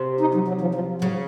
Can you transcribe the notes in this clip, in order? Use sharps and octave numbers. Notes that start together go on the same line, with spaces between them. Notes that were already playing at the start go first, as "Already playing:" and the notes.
Already playing: C3
D#4
F#3
F#3
F3
F3
C#3 F#3